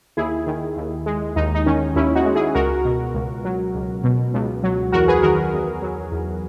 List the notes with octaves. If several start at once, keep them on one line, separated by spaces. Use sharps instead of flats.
D#2 E4 G#4
D#3
D#2
G#3
D#2 D#4
D#4
D#3 C#4
D#2 C#4 E4
D#4 F#4
G#3
E4 G#4
C#2 F#4 A#4
B2
C#2
F#3
C#2
B2
C#2
F#3
E2 F#4 A#4
G#4 B4
D#3 F#4 A#4
E2
F#3
E2